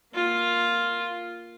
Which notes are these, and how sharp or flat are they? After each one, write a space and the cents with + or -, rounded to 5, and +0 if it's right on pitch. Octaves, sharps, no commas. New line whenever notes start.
A#3 +0 F4 +0